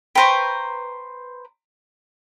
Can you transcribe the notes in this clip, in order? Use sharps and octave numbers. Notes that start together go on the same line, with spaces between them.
B4 C5 G5 A#5 C#6